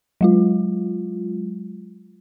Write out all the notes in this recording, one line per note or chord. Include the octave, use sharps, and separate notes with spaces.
F#3 G#3 F4